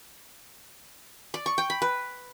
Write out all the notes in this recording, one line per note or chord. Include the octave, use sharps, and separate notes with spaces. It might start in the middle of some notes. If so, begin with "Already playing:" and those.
D5
C#6
G5
B5
B4